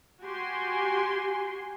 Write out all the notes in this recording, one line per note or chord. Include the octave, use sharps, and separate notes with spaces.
F#4 G4 G#5 C6